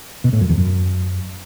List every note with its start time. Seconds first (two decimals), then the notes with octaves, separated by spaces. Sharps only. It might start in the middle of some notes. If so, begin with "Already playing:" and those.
0.24 B2
0.33 A2
0.41 F#2
0.49 E2
0.58 F#2